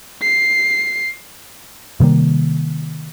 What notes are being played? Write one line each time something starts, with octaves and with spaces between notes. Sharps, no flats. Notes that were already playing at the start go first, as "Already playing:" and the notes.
C7
C3 D#3 G3 A#3